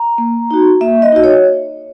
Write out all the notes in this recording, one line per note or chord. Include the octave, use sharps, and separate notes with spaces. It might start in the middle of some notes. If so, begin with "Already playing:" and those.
Already playing: A#5
A#3
D#4 F#4
A#3 E5
D#5
D#4 F#4 D#5
C#5